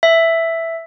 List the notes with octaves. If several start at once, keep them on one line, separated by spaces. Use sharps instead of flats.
E5